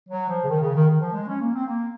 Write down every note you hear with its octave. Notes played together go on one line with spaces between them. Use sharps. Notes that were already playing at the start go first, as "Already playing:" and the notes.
F#3
F3
C#3
D#3
C#3
D#3
D#3
F3
G#3
C#4
A#3
C4
A#3